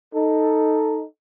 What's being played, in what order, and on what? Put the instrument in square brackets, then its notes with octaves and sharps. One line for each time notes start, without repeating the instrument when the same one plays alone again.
[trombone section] D#4 A4